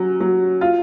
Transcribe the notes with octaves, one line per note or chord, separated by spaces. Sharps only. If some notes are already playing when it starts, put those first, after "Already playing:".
Already playing: F#3 C#4
F#3
F4